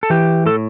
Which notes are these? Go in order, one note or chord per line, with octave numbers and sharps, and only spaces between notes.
A4
E3 G4
A2 A4